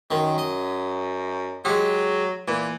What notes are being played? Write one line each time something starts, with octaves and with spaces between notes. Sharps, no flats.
F#2 D#3
D#5
F#3 G#3 G4
A#2 E3